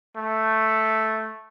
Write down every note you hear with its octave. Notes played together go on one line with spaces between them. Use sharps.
A3